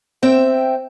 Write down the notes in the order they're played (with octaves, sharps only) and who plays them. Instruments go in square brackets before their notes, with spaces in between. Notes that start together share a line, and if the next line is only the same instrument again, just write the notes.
[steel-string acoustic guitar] C4 E5 G5